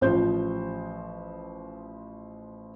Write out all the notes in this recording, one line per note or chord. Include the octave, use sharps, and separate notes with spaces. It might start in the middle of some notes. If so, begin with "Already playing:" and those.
A1 F3 C5 G6